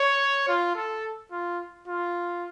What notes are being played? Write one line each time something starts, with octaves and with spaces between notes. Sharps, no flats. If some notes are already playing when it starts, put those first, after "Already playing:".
Already playing: C#5
F4
A4
F4
F4